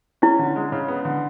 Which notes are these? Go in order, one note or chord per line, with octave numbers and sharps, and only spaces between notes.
C#4 E4
D3
G#3
C#3
B3
D3